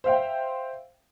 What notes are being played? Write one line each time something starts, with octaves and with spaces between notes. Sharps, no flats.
C5 E5 F5 G5